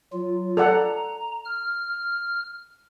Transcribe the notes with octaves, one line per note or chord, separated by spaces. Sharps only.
F#3 F4
A4 D5 F#5 A#5
F6